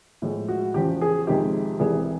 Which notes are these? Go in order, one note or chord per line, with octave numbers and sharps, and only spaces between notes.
A2 F3 G#3
F#4
E2 C#3 F3 G4
G#4
F2 C3 D#3 G#3 G4
C2 C3 E3 G3 G#4